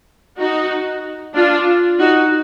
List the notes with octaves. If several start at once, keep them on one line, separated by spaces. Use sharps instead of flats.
D#4 F#4
D4 F4
D#4 F#4